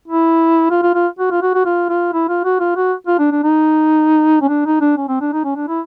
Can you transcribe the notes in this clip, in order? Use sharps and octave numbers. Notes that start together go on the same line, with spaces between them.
E4
F4
F4
F4
F#4
F4
F#4
F#4
F4
F4
E4
F4
F#4
F4
F#4
F4
D4
D4
D#4
C#4
D4
D#4
D4
C#4
C4
D4
D#4
C#4
D4
E4